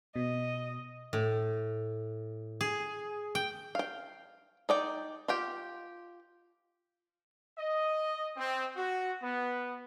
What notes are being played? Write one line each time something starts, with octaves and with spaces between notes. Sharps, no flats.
B2 D#5
A2
G#4
G5
F5 G5
D#4 D5 G5
F4 G4 G5
D#5
C4
F#4
B3